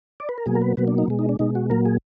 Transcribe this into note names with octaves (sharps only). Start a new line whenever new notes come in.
D5
B4
A#4
B2 F#3 A#3 G#4
A#4
B4
B2 F#3 A#3 B4
D4
D#4
B2 G#3
D#4
D4
B2 G#3 D#4
F#4
A#2 F#3 A#3 A#4
G#4